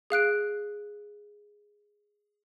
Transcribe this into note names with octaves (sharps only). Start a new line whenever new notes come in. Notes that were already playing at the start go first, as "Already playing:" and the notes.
G#4 F5 F#6 D7